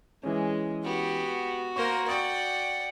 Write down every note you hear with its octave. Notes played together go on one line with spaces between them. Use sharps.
E3 G#3 C#4
B3 F#4 G4
A#3 A#4 C5 C#6
D5 F#5 G5 C#6 D#6